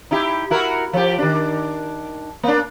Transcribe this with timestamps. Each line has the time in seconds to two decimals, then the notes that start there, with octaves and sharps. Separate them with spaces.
0.11 D#4 E4 G4
0.50 E4 F#4 A#4
0.93 F3 G4
1.18 D#3 D4
2.43 A#3 D4